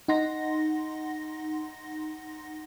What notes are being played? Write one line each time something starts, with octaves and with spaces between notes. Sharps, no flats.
D#4 F#5 C6 A#6